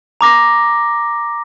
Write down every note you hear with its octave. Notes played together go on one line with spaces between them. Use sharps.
A#5 D6 A#6